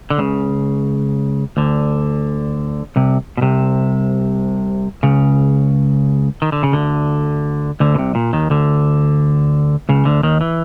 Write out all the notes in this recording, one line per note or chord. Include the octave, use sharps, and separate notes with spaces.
D3
C#2 C#3
D2 D3
C2 C3
B2
C2 C3
C#2 C#3
D#3
D3
C#3
D2 D3
D2 D3
B2
C2 C3
A#2
D#2 D#3
D2 D3
C#2 C#3
D2 D3
D#2 D#3
E3